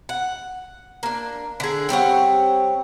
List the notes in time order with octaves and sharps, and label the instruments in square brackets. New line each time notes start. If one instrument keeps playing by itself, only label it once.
[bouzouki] F#5
A#3 D4
D3 G#4
G3 C4 C#5 F#5